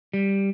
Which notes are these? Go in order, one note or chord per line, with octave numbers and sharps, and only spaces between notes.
G3